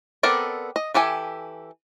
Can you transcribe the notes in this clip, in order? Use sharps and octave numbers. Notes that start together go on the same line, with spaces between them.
B3 C4 A4 A#4 D5
D#5
E3 G4 A4 G#5